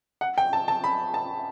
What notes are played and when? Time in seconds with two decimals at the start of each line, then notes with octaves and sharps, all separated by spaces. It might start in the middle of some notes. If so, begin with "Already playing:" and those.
0.21 F#5
0.38 G5
0.53 A5
0.68 A5
0.84 B5
1.14 A5